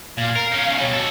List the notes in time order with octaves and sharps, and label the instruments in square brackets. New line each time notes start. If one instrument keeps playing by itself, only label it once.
[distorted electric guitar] A#2 [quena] F5
[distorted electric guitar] A#4
C#4 D#4
[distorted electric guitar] B2 G3 [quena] C#5
[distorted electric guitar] F#4 A4